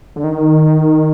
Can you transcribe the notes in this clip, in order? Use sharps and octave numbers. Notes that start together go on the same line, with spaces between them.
D3
D#3